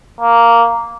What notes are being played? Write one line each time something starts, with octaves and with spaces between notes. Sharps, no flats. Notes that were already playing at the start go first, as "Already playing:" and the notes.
A#3